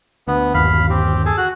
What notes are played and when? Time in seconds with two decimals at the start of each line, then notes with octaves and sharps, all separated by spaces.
0.28 D2 B3
0.54 G1 D#2 F5 B5
0.90 C4 G4
1.25 G#4 A4
1.37 F#4 F#6